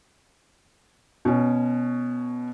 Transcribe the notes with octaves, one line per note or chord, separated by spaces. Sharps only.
B2 C#4